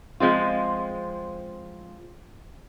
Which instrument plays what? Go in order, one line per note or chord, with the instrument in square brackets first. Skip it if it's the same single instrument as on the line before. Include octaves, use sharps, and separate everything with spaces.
[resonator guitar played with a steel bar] F3 G#3 C4 F4